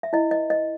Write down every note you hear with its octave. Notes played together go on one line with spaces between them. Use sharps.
E5
E4 D#5
B4 D#5
B4 D#5